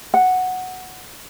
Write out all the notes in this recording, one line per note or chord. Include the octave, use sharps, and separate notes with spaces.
F#5